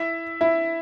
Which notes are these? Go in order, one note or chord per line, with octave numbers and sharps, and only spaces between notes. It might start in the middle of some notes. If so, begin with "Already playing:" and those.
Already playing: E4 E5
E4 E5